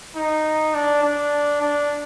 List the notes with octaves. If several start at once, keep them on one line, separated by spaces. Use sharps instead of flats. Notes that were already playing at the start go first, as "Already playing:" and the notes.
D#4
D4
D4
D4